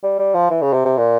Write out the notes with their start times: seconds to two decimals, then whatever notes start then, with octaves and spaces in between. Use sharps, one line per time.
0.03 G3
0.19 G3
0.34 F3
0.50 E3
0.62 C#3
0.73 C3
0.85 C3
0.97 A#2